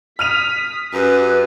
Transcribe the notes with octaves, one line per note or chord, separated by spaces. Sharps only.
D#6 F6 B6 D#7 F7
F#2 G4 G#4 B4